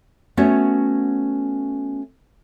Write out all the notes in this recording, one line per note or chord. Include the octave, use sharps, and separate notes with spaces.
A3 B3 C#4 F#4 C#5 E5